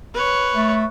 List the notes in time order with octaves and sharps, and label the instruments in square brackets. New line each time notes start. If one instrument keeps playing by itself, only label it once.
[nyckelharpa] B4 C#5
[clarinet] A3